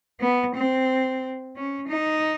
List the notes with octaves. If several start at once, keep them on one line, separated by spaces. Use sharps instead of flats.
B3
C4
C#4
D#4